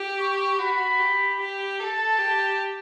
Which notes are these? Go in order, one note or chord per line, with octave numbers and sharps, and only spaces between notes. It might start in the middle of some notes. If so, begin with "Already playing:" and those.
Already playing: G4
C#6
F#4 B5
G4
G4
A4 A5
G4